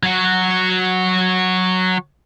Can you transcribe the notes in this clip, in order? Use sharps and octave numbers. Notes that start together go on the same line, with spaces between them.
F#3 F#4